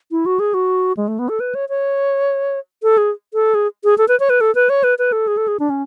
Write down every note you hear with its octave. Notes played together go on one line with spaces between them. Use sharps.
E4
F#4
G#4
F#4
G#3
A3
B3
A4
B4
C#5
C#5
A4
G#4
A4
G#4
G#4
A4
B4
C#5
B4
A4
B4
C#5
B4
B4
A4
G#4
A4
G#4
D4
C#4